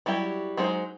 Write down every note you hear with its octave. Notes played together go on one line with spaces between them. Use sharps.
F#3 G3 E4 G4
F#3 G#3 D#4 C5